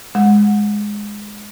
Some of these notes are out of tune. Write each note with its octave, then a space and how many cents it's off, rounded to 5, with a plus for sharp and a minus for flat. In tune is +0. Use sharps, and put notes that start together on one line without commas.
G#3 +0 F#5 -20